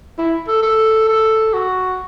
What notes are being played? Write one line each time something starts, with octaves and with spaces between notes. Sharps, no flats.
E4
A4
A4
A4
F#4